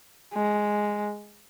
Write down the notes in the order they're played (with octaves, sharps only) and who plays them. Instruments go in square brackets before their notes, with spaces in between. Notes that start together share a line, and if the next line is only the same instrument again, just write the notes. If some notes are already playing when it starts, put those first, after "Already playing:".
[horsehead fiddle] G#3